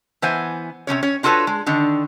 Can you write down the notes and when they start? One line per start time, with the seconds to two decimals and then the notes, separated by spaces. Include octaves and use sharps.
0.22 E3 B3 C5 G#5
0.87 C3 F3 C#4 C#5
1.03 C#4 C#5
1.23 D4 F4 F#4 A4 B4 C#5
1.47 G#3
1.66 D3 D#3 D4